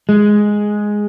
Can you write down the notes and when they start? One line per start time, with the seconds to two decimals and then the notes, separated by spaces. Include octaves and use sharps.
0.09 G#3